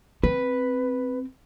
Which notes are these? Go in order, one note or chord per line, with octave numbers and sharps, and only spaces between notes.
C4 B4